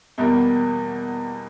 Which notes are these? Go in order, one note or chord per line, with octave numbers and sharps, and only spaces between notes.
E2 B2 G3 A#3